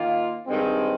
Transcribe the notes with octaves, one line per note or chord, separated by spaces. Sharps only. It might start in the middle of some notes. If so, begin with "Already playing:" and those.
Already playing: D#3 A#3 F4
G2 D#3 G#3 C4